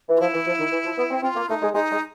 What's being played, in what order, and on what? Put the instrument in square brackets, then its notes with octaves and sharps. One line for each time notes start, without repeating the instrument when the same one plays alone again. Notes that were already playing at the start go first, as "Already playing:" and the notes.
[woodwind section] E3
[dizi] F4
[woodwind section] F3 [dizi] E4
[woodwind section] E3
F3
D#3
E3
F3
B3
C4
[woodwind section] C4 [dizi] F4
[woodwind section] A#3
[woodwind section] A3 [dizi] D#4
[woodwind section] G#3
[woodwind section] G#3 [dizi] D#4
[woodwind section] G#3